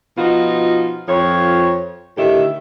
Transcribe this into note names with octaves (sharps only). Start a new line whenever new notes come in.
B2 F3 D#4 F4 F#4
F2 F3 C#5
A2 D3 D#3 G4 E5